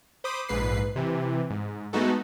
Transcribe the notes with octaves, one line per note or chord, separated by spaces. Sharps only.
C5 B5 D6 D#6
A#1 G#2 B4 C7
C3 E3
G#2
G#3 A3 B3 D#4 F#4 A4